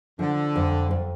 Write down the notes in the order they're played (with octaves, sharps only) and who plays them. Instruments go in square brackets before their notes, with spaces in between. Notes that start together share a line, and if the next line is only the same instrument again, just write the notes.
[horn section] D3 [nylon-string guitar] F3
[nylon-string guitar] F2
F2